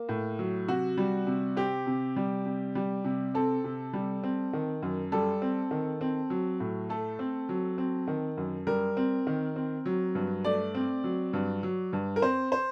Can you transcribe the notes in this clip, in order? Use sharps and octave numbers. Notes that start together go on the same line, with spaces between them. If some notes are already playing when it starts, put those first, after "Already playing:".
Already playing: A#3
A2
F#3
C3 F#4
G3
C3
C4 G4
C3
G3
C3
G3
C3
C4 A4
C3
G3
C4
D#3
F#2
G3 A4
C4
D#3
C4
F#3
A2
A3 A4
C4
F#3
C4
D#3
F#2
G3 A#4
C4
D#3
C4
F#3
G2
A3 D5
C4
F#3
G2
F#3
G2
A#4
C4 C5
C5